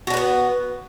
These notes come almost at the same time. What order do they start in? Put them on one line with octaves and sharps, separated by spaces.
F#4 D4 B4 B3